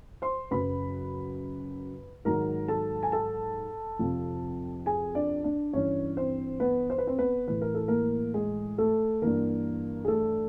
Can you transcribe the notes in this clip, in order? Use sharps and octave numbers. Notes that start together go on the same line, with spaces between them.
C5 C6
F#2 C#3 F#3 B4 B5
G#2 D#3 F#3 A#4 A#5
A4 A5
G#5
A4 A5
F2 C3 F3
G#4 G#5
D4 D5
D4 D5
G2 E3 C#4 C#5
C4 C5
B3 B4
C5
B4
C4 C5
B3 B4
A2 E3 B4
A#4
A4
A#3 A#4
G#3 G#4
A3 A4
G2 E3 A#3 A#4
G#4
A3 A4